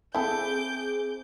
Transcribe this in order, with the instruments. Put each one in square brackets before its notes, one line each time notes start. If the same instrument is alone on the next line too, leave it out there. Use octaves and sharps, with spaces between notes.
[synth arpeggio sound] C4 G#4 [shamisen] E4 A4 [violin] D6 G6